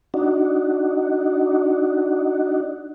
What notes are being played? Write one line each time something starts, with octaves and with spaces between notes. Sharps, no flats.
D4 D#4 F#4